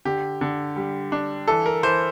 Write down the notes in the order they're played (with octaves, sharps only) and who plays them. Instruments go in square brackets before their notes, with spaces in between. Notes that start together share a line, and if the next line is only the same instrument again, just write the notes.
[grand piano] D3 G4
D3
G3
D4
E3 A4
A#4
E3 C5